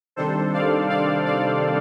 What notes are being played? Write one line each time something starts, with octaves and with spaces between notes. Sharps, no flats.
C3 D#3 G3 D4 A4 C5
D5 F5
D5 F5
D5 F5